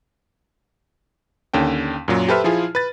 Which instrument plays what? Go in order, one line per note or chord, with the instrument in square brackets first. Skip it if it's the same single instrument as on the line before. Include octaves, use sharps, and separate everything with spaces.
[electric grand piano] D#2 D3 C#4 G5
F#2 A#2 F#3
G4 A4 B4 C5 E5 F6
F3 E4 F4 G#4
B4 A6